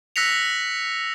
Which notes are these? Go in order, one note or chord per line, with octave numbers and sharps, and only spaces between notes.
E6 F#6 A#6 B6 C#7 F7